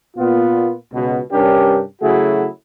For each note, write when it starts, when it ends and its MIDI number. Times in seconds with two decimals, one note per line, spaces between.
0.17 0.73 46
0.17 0.73 59
0.17 0.73 65
0.93 1.18 37
0.93 1.18 47
1.32 1.81 43
1.32 1.81 48
1.32 1.81 61
1.32 1.81 62
1.32 1.81 67
1.32 1.81 70
2.02 2.46 49
2.02 2.46 54
2.02 2.46 57
2.02 2.46 64
2.02 2.46 66
2.02 2.46 68